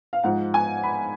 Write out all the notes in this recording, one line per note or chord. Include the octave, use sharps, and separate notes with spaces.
F5
G#2 F3 F#5
G#5
B5